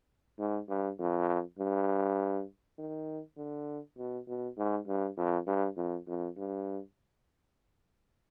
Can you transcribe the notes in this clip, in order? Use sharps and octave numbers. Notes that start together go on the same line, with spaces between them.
G#2
G2
F2
G2
D#3
D3
B2
B2
G#2
G2
F2
G2
F2
F2
G2